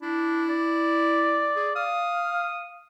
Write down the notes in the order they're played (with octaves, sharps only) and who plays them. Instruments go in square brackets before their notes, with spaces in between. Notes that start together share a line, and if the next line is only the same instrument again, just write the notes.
[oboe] D4 [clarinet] E4
[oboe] D5
[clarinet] G#4
[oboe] F5 [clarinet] D#6